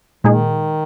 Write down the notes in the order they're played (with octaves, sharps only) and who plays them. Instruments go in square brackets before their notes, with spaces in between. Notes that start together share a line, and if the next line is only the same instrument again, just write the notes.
[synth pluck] A#2 G#3 D#4 G#4 [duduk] D#3